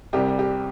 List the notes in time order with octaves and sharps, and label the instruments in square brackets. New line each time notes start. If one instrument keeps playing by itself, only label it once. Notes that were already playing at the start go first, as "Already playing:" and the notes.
[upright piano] C2 C3 G3 G4
G4